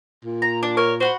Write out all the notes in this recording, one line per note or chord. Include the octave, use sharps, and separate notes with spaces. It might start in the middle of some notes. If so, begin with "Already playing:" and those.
A#2
A#5
D4
A#4 C#5
F#4 C5 F#5 B5